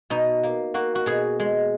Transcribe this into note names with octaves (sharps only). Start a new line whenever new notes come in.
B2 D#4
A#3
A#3 F#4
F#4
B2 G#4
G#3